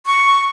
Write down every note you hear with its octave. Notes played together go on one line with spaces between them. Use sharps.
C#6